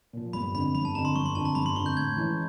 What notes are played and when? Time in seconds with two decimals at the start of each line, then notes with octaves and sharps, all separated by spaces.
0.13 A#2 F3
0.33 G1 B5
0.54 F2 D3 B5
0.74 G1 B5
0.85 A5
0.95 F2 A#5
0.99 D3
1.05 C6
1.15 G1 C#6
1.26 C6
1.35 F2 D3 A5
1.45 A#5
1.55 G1 B5
1.66 C6
1.76 D3 C#6
1.79 F2
1.86 G6
1.96 A2 G#6
2.16 E3 G#3 C#4 E4